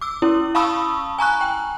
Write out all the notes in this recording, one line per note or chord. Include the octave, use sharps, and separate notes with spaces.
D6 E6
C#4 E4
F5 A5 B5 C#6 D#6 E6
G#5 A#5 C#6 F#6
G5